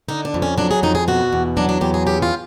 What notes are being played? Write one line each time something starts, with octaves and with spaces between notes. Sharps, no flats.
D3 D#4
D4
F2
C#4
F#3 D4
G#4
F2 D#4
G#4
B2 F#4
E2
F#3 D4
D4
E2 G4
G#4
C#3 G4
F4